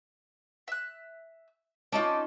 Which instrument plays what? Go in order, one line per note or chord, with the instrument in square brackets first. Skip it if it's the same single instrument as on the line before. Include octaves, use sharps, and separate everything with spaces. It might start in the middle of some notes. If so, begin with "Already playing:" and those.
[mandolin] E5 F#6
[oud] C#4 D#4 F4 [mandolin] D5 A5 D6